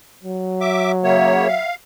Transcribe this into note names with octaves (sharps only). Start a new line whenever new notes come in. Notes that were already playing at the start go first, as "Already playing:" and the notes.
F#3
E5 D6
C#3 A#3 C#5 E5 F#5
F5